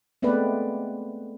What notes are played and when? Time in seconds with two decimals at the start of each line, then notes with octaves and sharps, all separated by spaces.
0.22 G#3 A3 B3 C4 B4 D5